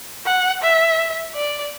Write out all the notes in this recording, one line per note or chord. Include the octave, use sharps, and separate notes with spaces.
F#5
E5
D5